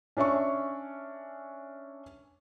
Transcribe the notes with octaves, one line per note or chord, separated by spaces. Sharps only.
C#4 D4 C#5 E5 C#6